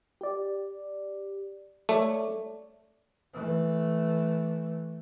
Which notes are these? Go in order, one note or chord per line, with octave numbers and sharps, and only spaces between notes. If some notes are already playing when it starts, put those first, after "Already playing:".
G4 D5
A3 C#5 D5
E3 A3